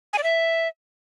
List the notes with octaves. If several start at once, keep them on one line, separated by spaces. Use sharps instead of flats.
G#5
D5
E5